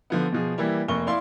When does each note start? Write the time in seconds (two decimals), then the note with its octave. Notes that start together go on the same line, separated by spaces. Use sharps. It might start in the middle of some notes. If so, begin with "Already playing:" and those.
0.10 D3 F3 B3
0.32 B2 F3 G#4
0.58 E3 G3 A#3 E4
0.88 F1 A#3 C#6 G7
1.07 E4 D5 F5 C6